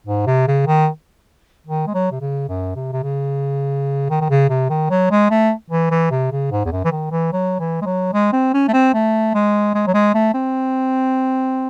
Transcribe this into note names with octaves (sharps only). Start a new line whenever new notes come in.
G#2
C3
C#3
D#3
D#3
G#3
F#3
C3
C#3
F#2
C3
C3
C#3
D#3
D#3
C#3
C3
D#3
F#3
G#3
A3
E3
E3
C3
C#3
G#2
E2
F#2
E3
D#3
E3
F#3
E3
G#3
F#3
G#3
C4
C#4
A3
C4
A3
G#3
G#3
F#3
G#3
A3
C4